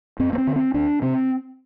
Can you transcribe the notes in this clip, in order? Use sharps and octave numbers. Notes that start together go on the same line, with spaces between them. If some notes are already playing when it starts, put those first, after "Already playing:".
F#2 C4
A#3
C4
D3
C4
D2 D4
C3 C4